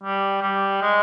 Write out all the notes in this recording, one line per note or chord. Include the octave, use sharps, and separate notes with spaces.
G3
G3
G#3